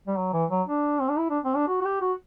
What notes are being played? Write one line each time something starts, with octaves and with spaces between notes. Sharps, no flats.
G3
F#3
E3
F#3
D4
C4
D4
E4
D4
C4
D4
F#4
F#4
G4
F#4